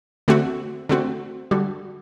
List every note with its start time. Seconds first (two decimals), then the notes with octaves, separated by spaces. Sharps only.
0.28 D3 A3 C4 F#4
0.89 D3 A3 C4 F#4
1.51 D3 G3 D4 F#4